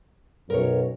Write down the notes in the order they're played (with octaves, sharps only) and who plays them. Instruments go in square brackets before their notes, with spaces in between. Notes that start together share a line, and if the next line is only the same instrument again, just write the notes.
[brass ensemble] B1 F#2 [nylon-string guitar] A#4 C#5